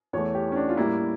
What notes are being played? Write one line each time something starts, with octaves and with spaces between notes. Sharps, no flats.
E2 E3 A3 C#5
G4
C#4
D4
F4
A2 G3 A#3 E4